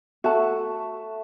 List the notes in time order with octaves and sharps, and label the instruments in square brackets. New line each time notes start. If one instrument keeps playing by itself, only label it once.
[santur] A3 [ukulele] F#4 A5